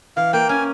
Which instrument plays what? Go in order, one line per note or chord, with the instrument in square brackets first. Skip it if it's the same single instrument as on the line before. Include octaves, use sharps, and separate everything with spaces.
[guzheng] E3 [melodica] F5
[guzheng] A#3 [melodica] G5
[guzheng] C#4 [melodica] G#5